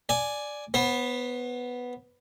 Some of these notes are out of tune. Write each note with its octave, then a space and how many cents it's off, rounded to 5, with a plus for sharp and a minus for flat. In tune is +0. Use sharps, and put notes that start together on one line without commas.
D5 +0 G#5 +5
B3 +0 C5 +35